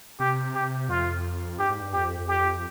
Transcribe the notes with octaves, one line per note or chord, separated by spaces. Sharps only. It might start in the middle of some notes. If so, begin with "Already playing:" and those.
C3 G4
G4
F2 F4
G2 G4
G#2
G2
F2 G4
G4